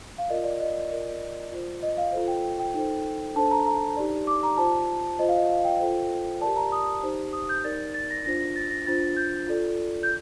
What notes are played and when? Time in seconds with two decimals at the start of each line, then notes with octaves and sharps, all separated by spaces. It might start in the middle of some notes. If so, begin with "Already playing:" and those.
0.18 F5
0.29 F4 A#4 D5 D#5
0.44 D5
0.60 D#5
0.91 F4 A#4 D5
1.52 F4 C5
1.83 D#5
1.97 F5
2.12 F4 A4 C5
2.28 G5
2.59 G5
2.74 D#4 A4 C5
3.35 D4 A4 C5 A5
3.51 A#5
3.66 A#5
3.97 D#4 G4 D5
4.27 D6
4.43 A#5
4.57 F4 C5 A5
5.19 F4 C5 D#5
5.28 F5
5.38 D#5
5.49 F5
5.65 G5
5.80 F4 A4 C5
6.41 D5 A5
6.44 G4 A#4
6.56 A#5
6.72 D#6
7.02 D#4 G4 C5
7.33 D#6
7.49 G6
7.64 D#4 A#4 D5 A6
7.94 A6
8.10 A#6
8.26 D4 F4 C5 A#6
8.40 A#6
8.56 A6
8.71 A#6
8.87 D4 F4 C5 A6
9.16 G6
9.47 F4 A4 D5
10.03 G6